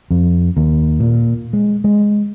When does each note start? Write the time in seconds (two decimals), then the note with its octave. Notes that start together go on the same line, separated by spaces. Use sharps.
0.11 F2
0.57 D#2
1.00 A#2
1.53 G#3
1.84 G#3